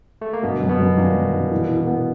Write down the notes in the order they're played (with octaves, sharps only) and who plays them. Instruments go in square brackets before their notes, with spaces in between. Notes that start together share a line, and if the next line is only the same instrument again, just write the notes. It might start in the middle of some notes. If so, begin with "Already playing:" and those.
[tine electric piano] A3
A#3
[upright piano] G1 [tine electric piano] B2 B3
[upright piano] F#2
[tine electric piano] B2 B3
[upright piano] F#2
[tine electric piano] A#2 A#3 [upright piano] D#3
[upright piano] F#2
D#3
E3
E3
B3